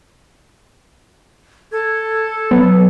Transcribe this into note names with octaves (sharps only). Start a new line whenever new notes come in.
A4 G#6
F#3 B3